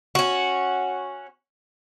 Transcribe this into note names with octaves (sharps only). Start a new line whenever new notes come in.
C#4 F#4